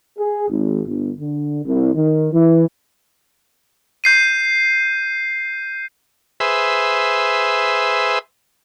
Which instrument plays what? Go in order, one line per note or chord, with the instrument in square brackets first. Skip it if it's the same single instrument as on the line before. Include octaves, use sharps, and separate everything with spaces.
[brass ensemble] G#4
G#1
G1
D3
C2
D#3
E3
[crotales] G6 C7 D#7
[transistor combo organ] G#4 B4 C5 E5